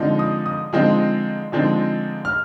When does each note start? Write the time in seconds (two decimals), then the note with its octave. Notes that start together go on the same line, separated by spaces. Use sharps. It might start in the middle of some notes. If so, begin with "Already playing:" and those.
Already playing: D3 F3 G#3 C4 D#4
0.19 D#6
0.46 D#6
0.73 D3 F3 G#3 C4 D#4
1.52 D3 F3 G#3 C4 D#4
2.25 F6